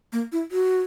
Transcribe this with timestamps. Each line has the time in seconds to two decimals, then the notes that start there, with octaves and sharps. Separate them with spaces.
0.12 A#3
0.32 E4
0.51 F#4